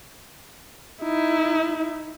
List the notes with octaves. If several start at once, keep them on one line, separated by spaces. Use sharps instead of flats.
D#4 E4